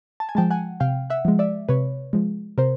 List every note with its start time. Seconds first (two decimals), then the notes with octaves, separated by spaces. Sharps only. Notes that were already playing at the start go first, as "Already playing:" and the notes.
0.20 A5
0.29 G#5
0.35 F3 G#3 G5 A5
0.50 F#5 G#5
0.80 C3 F5 G5
1.10 E5 F#5
1.25 F3 G#3
1.39 D5 E5
1.69 C3 B4 C#5
2.13 F3 G#3
2.58 C3 A#4 C5